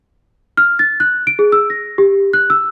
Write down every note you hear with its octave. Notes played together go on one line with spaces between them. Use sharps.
F6
A6
F#6
D7
G#4
E6
A#6
G4
F#6
E6